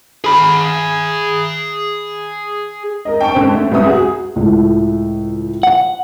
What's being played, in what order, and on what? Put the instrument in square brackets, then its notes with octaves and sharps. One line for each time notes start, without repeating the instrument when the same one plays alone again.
[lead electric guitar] G#4 B5
[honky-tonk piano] A#4 D#5
G5 A5 C#6 D7
D3 G#3 C4
A3
C2 F#2 B3 E5 D#6
F#4 G#4
[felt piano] C#2 A2
[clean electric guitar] F#5